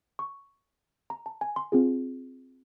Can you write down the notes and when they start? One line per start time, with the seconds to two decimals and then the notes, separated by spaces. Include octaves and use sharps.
0.19 C#6
1.10 A#5
1.26 A5
1.41 G#5
1.56 C6
1.72 C4 F4 G#4